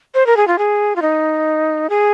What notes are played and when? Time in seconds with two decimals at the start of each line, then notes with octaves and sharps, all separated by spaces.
0.14 C5
0.27 A#4
0.37 G#4
0.48 F4
0.58 G#4
0.96 F4
1.02 D#4
1.90 G#4